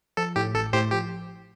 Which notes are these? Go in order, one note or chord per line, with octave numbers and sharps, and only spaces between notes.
F3 A4
A2 G4
A1 A4
A2 G4 C5
F3 G4